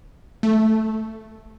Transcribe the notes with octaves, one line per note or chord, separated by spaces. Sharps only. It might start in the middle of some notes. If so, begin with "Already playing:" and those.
A3